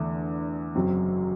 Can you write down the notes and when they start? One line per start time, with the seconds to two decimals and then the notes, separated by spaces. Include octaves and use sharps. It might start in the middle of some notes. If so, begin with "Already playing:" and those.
Already playing: E2 D3 A3
0.74 F#1 F#2 F#3 C4